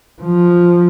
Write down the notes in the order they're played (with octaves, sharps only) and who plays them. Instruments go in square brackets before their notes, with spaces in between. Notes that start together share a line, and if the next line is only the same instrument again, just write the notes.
[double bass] F3